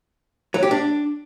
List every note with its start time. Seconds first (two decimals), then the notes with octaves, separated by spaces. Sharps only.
0.54 F#3
0.63 G4
0.71 D4